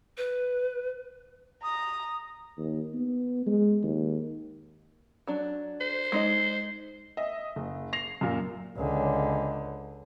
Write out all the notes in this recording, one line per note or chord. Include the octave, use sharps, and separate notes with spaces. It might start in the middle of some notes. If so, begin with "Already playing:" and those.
B4
A#5 D#6
D#2
B3
G#3
D#2
F#3 D4
C5
G#3 D#4 D#5
D#5 E5
F#1
A#6 C7 F7
F#2 A#2
C#2 D3